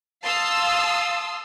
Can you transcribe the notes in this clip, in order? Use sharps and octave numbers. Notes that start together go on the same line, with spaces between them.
F5 A5 C6 D#6 E6